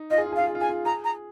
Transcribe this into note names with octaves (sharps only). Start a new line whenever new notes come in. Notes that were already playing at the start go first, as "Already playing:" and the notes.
Already playing: D#4
F4 D#5
G#4
F4
G#4
F5
F4
G#4
F4
G#4 G#5
F4
G#4 A#5
A#5